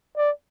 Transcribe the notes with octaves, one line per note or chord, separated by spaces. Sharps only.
D5